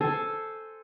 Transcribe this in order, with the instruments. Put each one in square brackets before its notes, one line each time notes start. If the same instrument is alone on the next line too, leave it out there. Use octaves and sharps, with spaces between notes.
[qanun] A4 C5 G#5